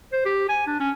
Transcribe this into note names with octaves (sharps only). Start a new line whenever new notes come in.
C5
G4
G#5
D4
C#4